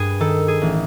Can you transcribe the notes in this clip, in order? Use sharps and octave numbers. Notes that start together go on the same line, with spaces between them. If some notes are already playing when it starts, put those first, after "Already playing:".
Already playing: G2 G#4 B4
D#3 A4
G#4
A1